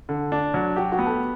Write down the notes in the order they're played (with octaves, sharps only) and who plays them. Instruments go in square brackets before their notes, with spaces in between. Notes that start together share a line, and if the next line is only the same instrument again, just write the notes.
[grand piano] D3
D4
F#3
[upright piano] F#4 [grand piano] G4
[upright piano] F#4
[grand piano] B3
[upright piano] A4